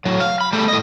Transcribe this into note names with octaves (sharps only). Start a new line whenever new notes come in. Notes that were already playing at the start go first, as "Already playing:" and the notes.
A2 F#3
F5
B5
G3 A3
A2 D#5